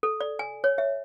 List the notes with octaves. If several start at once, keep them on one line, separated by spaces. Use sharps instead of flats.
A4
D5
G#5
C#5
E5